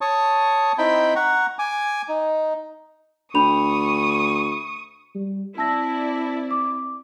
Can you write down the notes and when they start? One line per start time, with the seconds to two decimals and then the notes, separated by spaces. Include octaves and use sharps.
0.01 C#5 A5 C#6 D#6
0.78 C4 D#4 E4 G5 B5
1.16 F#5 A#5 C#6
1.59 G#5 D6
2.08 D#4
3.35 D2 D4 B5 C#6 D#6 F7
5.15 G3
5.58 C4 E4 D5 A5 E6 A#6
6.51 D6